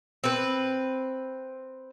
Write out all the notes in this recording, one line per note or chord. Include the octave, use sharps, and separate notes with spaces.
C4 B4